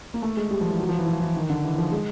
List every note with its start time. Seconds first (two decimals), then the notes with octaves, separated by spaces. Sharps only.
0.14 A#3
0.22 A3
0.37 G#3
0.51 G3
0.61 F3
0.70 E3
0.80 F#3
0.89 F3
0.98 E3
1.07 F3
1.21 E3
1.36 D#3
1.50 D3
1.64 E3
1.78 F3
1.92 G#3